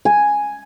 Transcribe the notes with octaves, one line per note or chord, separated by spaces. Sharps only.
G#5